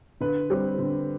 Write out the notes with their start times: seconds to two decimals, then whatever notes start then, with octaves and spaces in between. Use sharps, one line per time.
0.20 D3 B4
0.50 G3 C4
0.79 D3